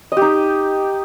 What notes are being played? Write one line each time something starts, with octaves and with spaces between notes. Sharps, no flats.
D#4 G4 D#5